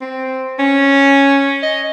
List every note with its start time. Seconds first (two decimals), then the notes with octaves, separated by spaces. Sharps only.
0.01 C4
0.59 C#4
1.63 D#5